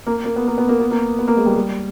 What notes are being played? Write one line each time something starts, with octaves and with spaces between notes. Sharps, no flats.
A#3
A#3
B3
A#3
B3
A#3
B3
A#3
B3
A#3
G#3
G3
G3